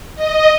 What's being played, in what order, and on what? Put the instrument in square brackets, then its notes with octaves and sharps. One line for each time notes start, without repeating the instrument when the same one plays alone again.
[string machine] D#5